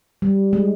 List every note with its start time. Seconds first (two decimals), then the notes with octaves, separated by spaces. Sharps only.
0.22 G3
0.53 G#3